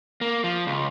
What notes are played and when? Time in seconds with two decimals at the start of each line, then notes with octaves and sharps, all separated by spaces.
0.21 A#3
0.44 F3
0.67 C#2